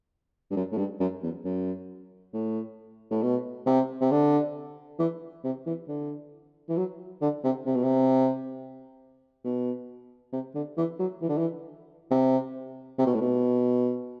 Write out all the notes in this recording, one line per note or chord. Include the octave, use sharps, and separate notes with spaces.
G2
F#2
A2
G2
F#2
E2
F#2
A2
A2
B2
C3
C3
D3
E3
C3
E3
D3
E3
F#3
D3
C3
C3
B2
C3
B2
C3
D3
E3
F#3
E3
D3
E3
C3
C3
B2
A2
B2